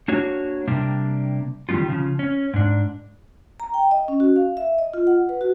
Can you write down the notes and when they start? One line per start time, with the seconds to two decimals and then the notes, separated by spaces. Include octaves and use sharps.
0.08 A#3 D4 F#4 C#5
0.68 C3 G3 A#3 D4
1.69 D#3 G3 G#3 D#4 F4
1.88 C#3 F3
2.19 C#4
2.54 G#2 D4
3.60 A#5
3.74 G5
3.91 D#5
4.08 C#4
4.20 F#4
4.36 F5
4.57 E5
4.78 D#5
4.94 F4
5.07 F#5
5.29 B4
5.41 F#4